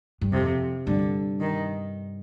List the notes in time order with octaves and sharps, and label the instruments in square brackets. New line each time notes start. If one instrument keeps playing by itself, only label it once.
[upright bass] G2
[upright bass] F2 [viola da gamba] C3
[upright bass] G2 [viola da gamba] D3
[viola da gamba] D#3